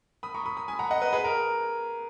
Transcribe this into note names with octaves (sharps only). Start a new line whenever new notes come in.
B5 D#6
A#5 C#6
B5 D#6
B5 D#6
G#5 B5
F#5 A#5
D#5 F#5
B4 D#5
G#4 B4
A#4